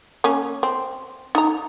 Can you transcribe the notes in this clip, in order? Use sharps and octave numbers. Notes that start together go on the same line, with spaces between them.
A#3 C#4
C4
D#4 A#5